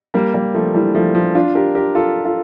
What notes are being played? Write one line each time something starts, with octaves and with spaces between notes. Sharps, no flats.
G3 A#3
G3 A#3
F3 A3
E3 G3
F3 A3
F3 A3
D4 F4
G4 A#4
G4 A#4
F4 A4
F4 A4